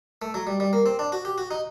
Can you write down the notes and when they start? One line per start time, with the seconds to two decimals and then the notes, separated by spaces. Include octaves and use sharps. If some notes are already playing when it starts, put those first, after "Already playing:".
0.22 A3
0.34 F#3
0.47 G3
0.60 G3
0.73 A#3
0.86 C4
0.99 D4
1.12 F#4
1.25 G4
1.38 F#4
1.51 D#4